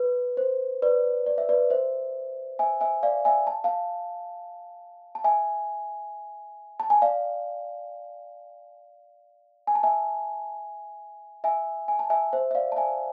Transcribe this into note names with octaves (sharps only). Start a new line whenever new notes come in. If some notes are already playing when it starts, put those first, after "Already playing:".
Already playing: B4
C5
B4 D5
D5
E5
B4 D5
C5 E5
E5 G#5
E5 G#5
D5 F5
E5 G#5
A5
F5 A5
A5
E5 G#5
A5
G#5
D5 F5
G#5
A5
E5 G#5
E5 G#5
G#5
A5
E5 G#5
C5 E5
E5
D5 F5
A5
E5 G#5